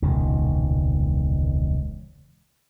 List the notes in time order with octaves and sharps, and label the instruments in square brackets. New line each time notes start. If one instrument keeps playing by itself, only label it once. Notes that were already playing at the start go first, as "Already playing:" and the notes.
[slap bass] E1 C#2 A#2 D#3